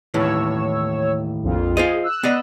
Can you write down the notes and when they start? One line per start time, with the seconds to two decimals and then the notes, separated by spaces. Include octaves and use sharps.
0.14 D#2 A2 E3 C#5 E6
1.43 A#1 F2 F4
1.77 F4 G#4 C5 D#5
2.04 E6 F#6
2.23 B3 D5 D#5